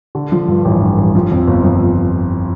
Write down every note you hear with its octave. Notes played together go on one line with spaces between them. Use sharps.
D3
F3
G2
A1
G2
A1
F3
F2
G1
F3